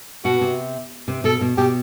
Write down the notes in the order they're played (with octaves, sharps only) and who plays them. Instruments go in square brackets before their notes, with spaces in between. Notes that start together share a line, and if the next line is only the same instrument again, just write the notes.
[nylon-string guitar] B2 [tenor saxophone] F#4
[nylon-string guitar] C3
C3
[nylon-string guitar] B2 [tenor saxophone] A4
[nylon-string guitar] B2
[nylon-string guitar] B2 [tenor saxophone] G4